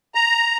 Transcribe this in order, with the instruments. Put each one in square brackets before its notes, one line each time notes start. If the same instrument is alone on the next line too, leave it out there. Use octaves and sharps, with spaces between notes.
[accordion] A#5